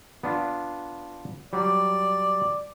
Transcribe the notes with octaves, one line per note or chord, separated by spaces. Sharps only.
B3 D4 F4
F#3 G3 D5